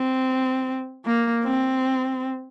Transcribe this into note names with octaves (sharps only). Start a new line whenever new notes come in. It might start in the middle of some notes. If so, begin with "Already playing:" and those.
Already playing: C4
A#3
C4